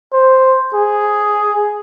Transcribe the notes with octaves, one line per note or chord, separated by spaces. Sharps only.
C5
G#4